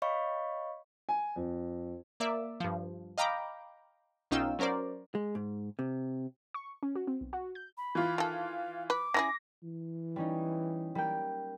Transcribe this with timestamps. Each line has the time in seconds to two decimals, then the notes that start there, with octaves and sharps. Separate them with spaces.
0.02 C#5 D#5 F5 B5 C#6
1.09 G#5
1.36 F2
2.20 A#3 D5 E5
2.60 G2 F3
3.18 D#5 F5 G5 A#5 B5 D6
4.31 B1 C#4 D#4 F4 G5 E6
4.59 F#3 C#4 A#4 C5 D5
5.15 G#3
5.35 G#2
5.79 C3
6.54 C#6
6.83 C#4
6.95 F#4
7.07 C4
7.21 B1
7.33 F#4
7.55 G6
7.77 B5
7.95 E3 F4
8.18 D#3 A4 F5
8.90 B4 D6
9.14 C#4 E4 G#4 A#6
9.63 E3
10.16 G3 C#4 D#4
10.95 G3 A#3 G5